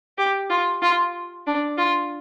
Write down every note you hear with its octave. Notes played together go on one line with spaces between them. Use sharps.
G4
F4
F4
D4
F4